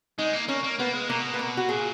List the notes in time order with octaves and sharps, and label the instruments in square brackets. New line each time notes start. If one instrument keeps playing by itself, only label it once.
[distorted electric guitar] G#3 [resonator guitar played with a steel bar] D#4
[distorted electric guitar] A#3
[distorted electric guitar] A#3 [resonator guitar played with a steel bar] C#4
[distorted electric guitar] A#3
[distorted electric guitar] A#3 [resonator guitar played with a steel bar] B3
[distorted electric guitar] G#3
[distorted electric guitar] B2 [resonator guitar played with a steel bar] A#3
[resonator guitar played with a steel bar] B3
A#3
F#4
[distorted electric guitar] A#2 [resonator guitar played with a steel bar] G#4